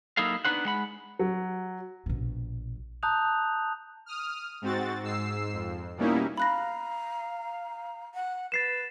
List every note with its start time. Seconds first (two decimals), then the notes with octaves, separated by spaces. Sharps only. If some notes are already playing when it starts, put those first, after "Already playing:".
0.17 F#3 A#3 D#4 E4 A4 F5
0.45 B3 D4 D#4 B4 C5 F#5
0.65 G#3 F#5 B5
1.19 F#3
2.06 A#1 B2
3.03 A5 A#5 D#6 F#6 G6 F7
4.06 D#6 F6
4.62 G#2 C4 F#4 A6
5.03 G#2 E6 C7
5.53 F2
5.97 B2 G3 A#3 C#4 D#4 E4
6.38 F5 A#5 B5 F#6 A#6
8.15 F#5
8.52 B4 A6 C7 E7